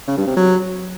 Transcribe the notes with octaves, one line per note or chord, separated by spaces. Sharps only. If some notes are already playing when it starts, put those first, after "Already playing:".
C#3
G2
C3
F#3